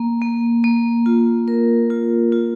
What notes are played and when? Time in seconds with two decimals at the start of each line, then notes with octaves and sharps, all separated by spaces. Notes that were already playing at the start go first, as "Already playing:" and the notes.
Already playing: A#3
0.21 A#3
0.64 A#3
1.06 F4
1.48 A#4
1.90 F4
2.32 F4